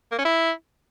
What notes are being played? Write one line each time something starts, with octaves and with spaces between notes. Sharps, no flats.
A#3
C#4
E4